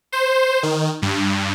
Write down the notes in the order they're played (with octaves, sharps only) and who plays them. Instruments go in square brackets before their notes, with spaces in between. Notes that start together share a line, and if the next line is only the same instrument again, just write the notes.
[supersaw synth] C5
D#3
G2